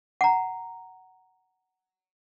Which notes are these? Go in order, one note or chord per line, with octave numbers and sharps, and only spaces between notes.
F#5 A#5